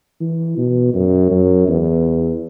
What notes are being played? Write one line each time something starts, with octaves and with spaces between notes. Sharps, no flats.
E3
B2
F#2
F#2
E2